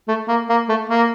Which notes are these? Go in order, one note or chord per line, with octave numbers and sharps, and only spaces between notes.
A3
A#3
A#3
A3
A#3